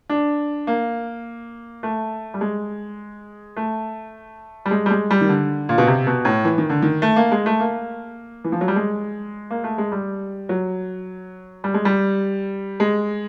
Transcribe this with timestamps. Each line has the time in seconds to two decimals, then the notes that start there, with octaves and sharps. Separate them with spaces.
0.10 D4
0.67 A#3
1.83 A3
2.34 G3
2.41 G#3
3.57 A3
4.66 G3
4.71 G#3
4.86 G3
4.90 G#3
5.11 G3
5.21 D#3
5.29 D3
5.69 A#2
5.78 B2
5.87 C3
6.07 B2
6.25 A2
6.45 E3
6.58 D#3
6.70 D3
6.82 D#3
7.02 A3
7.16 A#3
7.32 G#3
7.46 A3
7.60 A#3
8.45 E3
8.52 F3
8.61 F#3
8.68 G3
8.76 G#3
9.51 A#3
9.64 A3
9.78 G#3
9.92 G3
10.49 F#3
11.64 G3
11.74 G#3
11.85 G3
12.80 G#3